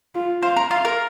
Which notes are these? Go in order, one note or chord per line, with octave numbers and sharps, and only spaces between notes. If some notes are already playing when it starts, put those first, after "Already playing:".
F4
C5 F5
A#4
F4 F5
A#4